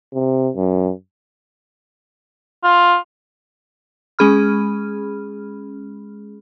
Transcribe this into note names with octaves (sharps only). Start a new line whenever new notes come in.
C3
F#2
F4
G#3 C#4 G#4 B5 F6